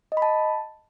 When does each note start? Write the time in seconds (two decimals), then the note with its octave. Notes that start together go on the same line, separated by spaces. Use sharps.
0.12 D#5
0.17 B5
0.22 A5